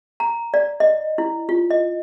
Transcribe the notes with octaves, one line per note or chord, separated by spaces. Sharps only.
A#5
D5
D#5
E4
F4
D#5